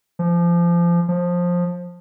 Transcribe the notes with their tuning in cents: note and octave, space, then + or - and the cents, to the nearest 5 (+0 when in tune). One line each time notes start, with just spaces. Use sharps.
F3 -25
F3 +15